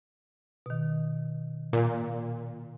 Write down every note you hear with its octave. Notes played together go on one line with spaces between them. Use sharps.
B2 D#3
A#2